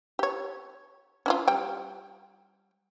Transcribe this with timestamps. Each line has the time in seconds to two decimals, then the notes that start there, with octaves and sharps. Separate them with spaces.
0.19 G4 C#5
1.26 C#4 E4 F4
1.48 G3 G5